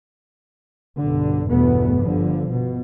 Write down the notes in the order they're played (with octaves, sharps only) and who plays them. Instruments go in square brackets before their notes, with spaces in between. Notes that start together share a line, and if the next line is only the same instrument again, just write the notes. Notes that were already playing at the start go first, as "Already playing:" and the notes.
[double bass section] B1 G2 D3
G1 E2 B2 A3 B3
G1 G2 D3 F3
B2